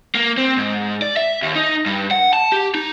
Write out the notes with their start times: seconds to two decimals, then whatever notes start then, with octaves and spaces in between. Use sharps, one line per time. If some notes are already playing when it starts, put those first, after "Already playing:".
0.15 A#3
0.37 C4
0.57 G#2
1.02 D5
1.16 E5
1.42 D#2
1.55 D#4
1.86 G2
2.11 F#5
2.33 A5
2.52 G4
2.74 D#4